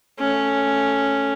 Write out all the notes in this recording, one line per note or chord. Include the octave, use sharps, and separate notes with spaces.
A3 C#4